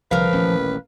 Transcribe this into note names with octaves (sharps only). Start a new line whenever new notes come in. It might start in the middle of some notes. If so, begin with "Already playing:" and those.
C2 D3 F3 A#4 B4 F5
D#1 A1 C#4